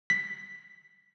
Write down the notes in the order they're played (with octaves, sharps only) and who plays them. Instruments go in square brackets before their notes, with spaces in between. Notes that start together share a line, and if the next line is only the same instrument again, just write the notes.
[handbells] B6